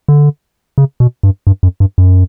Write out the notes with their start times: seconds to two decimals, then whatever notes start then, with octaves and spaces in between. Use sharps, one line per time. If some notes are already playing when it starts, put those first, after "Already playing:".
0.08 D3
0.78 C#3
1.00 B2
1.23 G2
1.47 G2
1.63 F#2
1.80 G2
1.98 F#2